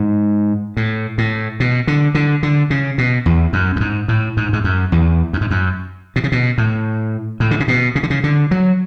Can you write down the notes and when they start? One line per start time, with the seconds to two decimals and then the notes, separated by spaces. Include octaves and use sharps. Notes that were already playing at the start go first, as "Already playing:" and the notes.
Already playing: G#2
0.77 A2
1.18 A2
1.60 B2
1.87 D3
2.15 D3
2.43 D3
2.70 C#3
2.98 B2
3.26 E2
3.53 F#2
3.76 F#2
3.80 G#2
4.08 A2
4.37 G#2
4.53 G#2
4.64 F#2
4.92 E2
5.33 F#2
5.41 G#2
5.51 F#2
6.16 B2
6.24 C#3
6.32 B2
6.58 A2
7.40 A2
7.51 D3
7.60 C#3
7.68 B2
7.95 C#3
8.03 D3
8.10 C#3
8.24 D3
8.51 F#3